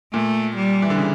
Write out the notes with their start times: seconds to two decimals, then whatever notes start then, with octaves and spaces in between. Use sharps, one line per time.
0.13 A#2 A3
0.55 G3
0.82 E3
0.90 D3
0.98 C#3